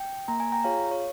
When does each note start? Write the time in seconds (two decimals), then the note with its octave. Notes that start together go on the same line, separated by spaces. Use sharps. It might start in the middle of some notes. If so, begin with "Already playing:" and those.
Already playing: G5
0.28 A#3 A#5
0.40 G#5
0.52 G5 A#5
0.64 F4 G#4 C#5 F5
0.91 C#5